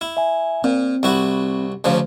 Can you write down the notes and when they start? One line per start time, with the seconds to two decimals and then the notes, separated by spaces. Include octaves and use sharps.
0.01 E4
0.17 E5 G#5
0.64 A#2 C4
1.03 C2 E4 F#4
1.84 D2 C#3 F3